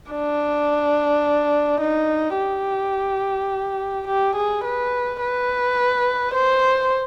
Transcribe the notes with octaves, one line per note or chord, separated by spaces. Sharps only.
D4
D#4
G4
G4
G#4
B4
B4
C5